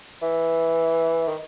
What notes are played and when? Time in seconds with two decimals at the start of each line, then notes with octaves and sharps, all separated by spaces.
0.22 E3
1.28 D#3